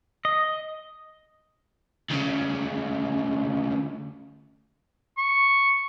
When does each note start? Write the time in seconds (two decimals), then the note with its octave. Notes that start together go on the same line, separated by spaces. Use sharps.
0.25 D#5
2.11 D2 C#3
5.18 C#6